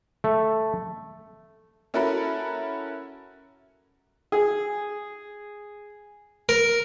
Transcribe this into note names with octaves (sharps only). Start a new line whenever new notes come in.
A3
C#4 E4 F#4 A4 A#4 B5
G#4
A#4